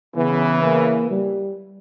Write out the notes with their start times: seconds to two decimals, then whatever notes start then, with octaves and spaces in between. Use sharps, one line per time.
0.15 C#3 E3 B3
0.63 A#3
1.10 G3